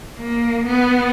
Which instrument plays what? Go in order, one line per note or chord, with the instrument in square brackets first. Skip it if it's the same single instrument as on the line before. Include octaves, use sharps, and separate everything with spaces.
[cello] A#3
B3